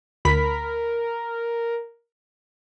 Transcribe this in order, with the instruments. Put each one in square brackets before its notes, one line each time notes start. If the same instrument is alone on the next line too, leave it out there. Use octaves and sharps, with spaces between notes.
[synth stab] D2 B5 B6 [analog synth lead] A#4